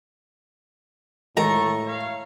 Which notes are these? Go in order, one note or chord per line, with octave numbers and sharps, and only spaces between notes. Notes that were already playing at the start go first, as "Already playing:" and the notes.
C#2 A2 D#3 A4 A#5 C#6
C#5 F5